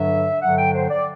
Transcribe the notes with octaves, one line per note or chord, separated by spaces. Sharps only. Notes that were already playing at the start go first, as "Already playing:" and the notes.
Already playing: G2 D3 F#3 E5
G2 D3 F#3 F#5
G5
C5
D5